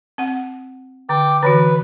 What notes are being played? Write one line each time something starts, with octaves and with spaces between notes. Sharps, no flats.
C4 F#5
D3 G5 D6
D3 E3 F#4 B4